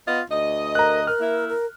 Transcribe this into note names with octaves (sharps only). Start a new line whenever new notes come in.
B3 F4 D#5
D2 D#5
A#4 A#5 F#6
A#4 F6
A#3 E4
A#4